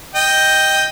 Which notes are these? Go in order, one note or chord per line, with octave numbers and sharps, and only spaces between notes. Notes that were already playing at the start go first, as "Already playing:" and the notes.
D#5 G5